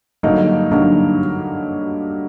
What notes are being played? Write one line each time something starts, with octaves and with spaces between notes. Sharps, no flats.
G2 D3 F#3 A#3 D#4
G2 D3 F#3 A#3 D#4